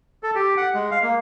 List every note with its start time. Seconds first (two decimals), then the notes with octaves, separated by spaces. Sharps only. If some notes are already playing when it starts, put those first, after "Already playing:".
0.23 A4
0.35 G4
0.57 F#5
0.74 G#3
0.91 F5
1.03 A#3